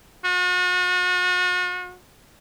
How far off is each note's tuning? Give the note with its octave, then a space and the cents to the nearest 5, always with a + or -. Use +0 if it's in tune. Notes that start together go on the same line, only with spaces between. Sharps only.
F#4 -40